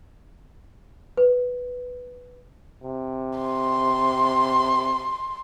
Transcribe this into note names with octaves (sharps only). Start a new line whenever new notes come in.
B4
C3
C6